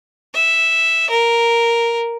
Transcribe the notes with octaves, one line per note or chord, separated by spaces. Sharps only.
E5
A#4